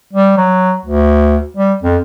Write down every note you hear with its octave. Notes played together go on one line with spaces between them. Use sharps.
G3
F#3
D2
G3
F2